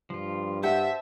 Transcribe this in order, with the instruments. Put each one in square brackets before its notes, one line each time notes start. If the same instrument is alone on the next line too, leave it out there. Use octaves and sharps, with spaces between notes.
[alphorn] G2 [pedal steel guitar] F3 F4
[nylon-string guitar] G4 F#5 [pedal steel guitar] C5 A5 G6 [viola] E5